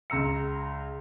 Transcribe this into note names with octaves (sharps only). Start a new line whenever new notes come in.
C#2 A#5 E6 C#7